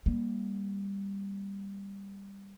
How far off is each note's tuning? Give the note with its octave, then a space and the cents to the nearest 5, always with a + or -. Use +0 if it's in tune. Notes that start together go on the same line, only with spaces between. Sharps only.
G3 +10 A#3 +15